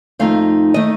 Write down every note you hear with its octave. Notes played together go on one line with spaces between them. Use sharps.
F2 D#3 A3 D#4 F5
D#3 A3 D#4 D#5